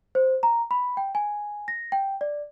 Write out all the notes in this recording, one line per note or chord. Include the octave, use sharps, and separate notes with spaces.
C5
A#5
B5
G5
G#5
A#6
G5
D5